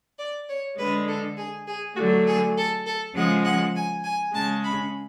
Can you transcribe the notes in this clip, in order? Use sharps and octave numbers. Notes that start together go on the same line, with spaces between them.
D5
C#5
D3 G#3 B4
A4
G#4
G#4
D3 F#3 A3 F#4
G#4
A4
A4
C#3 F3 G#3 F#5
F#5
G#5
G#5
C#3 G#3 A5
B5